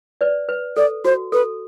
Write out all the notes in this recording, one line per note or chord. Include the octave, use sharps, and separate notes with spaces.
B4 D5
B4
A4 D5
F#4 C5
A4 B4